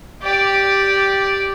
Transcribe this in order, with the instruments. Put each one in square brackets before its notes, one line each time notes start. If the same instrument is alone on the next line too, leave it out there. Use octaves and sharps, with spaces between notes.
[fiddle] G4 D5